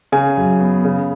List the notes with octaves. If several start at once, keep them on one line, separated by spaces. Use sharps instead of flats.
C#3 G#5
F#2
B3
C#3